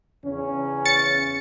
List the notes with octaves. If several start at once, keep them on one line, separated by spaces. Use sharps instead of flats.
E2 C#3 C#4
A6 C#7